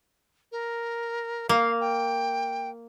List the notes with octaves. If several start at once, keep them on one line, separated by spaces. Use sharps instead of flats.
A#4
A#3 F5
G5